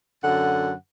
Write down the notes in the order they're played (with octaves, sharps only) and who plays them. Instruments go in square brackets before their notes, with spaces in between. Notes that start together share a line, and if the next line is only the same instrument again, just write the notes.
[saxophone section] F#2 D3 F#5